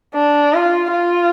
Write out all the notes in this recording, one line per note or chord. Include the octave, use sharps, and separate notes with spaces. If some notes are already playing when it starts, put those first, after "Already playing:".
D4
F4
F4